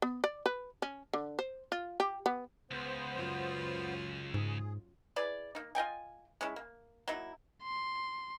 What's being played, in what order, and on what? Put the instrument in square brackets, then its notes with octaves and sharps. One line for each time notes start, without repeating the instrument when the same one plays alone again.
[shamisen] B3
D5
B4
C#4
D3
C5
F4
G4
B3
[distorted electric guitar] C#2 [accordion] B3 C5
[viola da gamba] F#2 F4
[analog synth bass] G#2 [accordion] G#4
[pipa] E4 G#4 B4 D5
A#3 D#4
F4 D#5 G5 G#5
G#3 C#4 E4
A#3
F#3 A#3 D#4 E4
[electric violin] C6